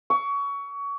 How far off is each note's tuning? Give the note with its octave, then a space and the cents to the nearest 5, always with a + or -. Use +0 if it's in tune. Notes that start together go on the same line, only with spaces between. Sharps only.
C#6 +25 E6 +0